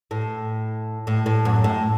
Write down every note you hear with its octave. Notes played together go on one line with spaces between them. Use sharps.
A2
A2
A2
F#2
A2